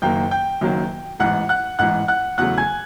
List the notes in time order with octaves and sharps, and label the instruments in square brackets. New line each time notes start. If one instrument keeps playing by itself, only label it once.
[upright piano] F#1 F#2 D#3 F#3 A#3 G5 G6
G5 G6
F#1 F#2 D#3 F#3 A#3
A1 G#2 E3 F#5 F#6
F#5 F#6
A1 G#2 E3 F#5 F#6
F#5 F#6
E2 C#3 F#3 A3 F#5 F#6
G#5 G#6